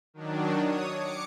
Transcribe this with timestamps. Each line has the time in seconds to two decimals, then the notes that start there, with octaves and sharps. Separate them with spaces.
0.14 D#3 F#3 D4
0.62 C#5 D#6
0.94 D6 C#7